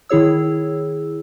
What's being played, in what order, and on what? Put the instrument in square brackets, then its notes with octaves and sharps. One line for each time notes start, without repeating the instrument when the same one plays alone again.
[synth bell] D#3 E4 G#4 C#5 E6